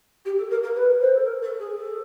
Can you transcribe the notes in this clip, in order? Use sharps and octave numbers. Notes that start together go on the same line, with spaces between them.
G4
A4
A#4
A#4
B4
C5
A4
A#4
A4
G#4
A4